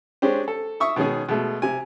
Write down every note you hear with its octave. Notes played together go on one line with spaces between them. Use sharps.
G#3 C#4 D4 G4 C5
A4
E5 C#6 D#6 E6
B2 D#3 G#3 C#4 G#4
B2 G#3 A3
C3 G#5